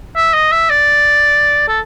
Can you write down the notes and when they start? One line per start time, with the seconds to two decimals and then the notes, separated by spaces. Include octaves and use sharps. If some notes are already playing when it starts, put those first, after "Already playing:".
0.16 E5
0.34 D#5
0.52 E5
0.70 D5
1.68 A4